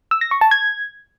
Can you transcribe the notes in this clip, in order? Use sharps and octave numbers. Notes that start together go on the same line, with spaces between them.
E6
A#6
C#6
A5
G#6